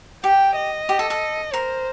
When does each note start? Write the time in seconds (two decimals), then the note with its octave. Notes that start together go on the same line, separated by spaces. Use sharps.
0.24 G4 G5
0.55 D#5
0.89 G4
0.99 A4
1.10 A4
1.52 A#4 C5